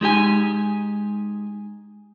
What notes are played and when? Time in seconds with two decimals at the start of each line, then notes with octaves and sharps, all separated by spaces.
0.01 G#3 D#4 G4 G#5